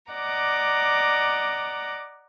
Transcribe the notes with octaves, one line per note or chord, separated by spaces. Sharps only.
D5 D#5 F#5 A#5 D6